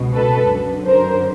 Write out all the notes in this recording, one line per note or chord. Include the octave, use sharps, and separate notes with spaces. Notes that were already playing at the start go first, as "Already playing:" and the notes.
Already playing: C#2 B2
A4 B4
F#2 D3
A#4 C5